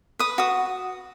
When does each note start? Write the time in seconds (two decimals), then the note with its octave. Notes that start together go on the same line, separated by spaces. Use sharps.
0.19 B4 D#6
0.38 F#4 D#6